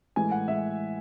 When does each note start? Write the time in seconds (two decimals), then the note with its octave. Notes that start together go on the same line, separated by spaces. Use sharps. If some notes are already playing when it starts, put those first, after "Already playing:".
0.16 A2 E3 G#3 G#5
0.31 F#5
0.48 G#3 E5